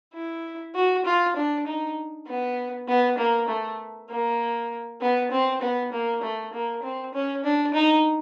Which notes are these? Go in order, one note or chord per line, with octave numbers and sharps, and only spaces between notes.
E4
F#4
F4
D4
D#4
B3
B3
A#3
A3
A#3
B3
C4
B3
A#3
A3
A#3
C4
C#4
D4
D#4